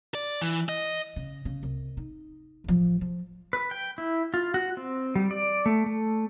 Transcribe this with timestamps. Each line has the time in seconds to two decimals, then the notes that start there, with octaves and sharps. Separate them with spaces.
0.15 D5
0.41 E3
0.69 D#5
1.16 C#3
1.45 C#3
1.63 C2
1.97 D#4
2.64 A1 F3
3.01 F3
3.53 B4
3.71 G5
3.98 E4
4.34 F4
4.54 F#4
4.77 C4
5.15 G3
5.31 D5
5.66 A3
5.86 A3